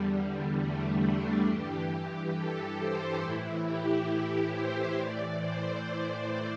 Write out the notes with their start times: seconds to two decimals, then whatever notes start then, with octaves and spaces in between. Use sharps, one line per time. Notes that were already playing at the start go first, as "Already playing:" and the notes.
Already playing: E2 D3 G3
0.14 G3
0.58 A3
1.02 D4
1.45 G2 E3 G4
1.89 G4
2.33 A4
2.78 C5
3.20 A2 E3 E4
3.65 G4
4.09 G4
4.52 C5
4.97 A2 E3 D5
5.40 C5
5.85 D5